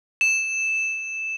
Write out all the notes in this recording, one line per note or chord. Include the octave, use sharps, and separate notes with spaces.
E7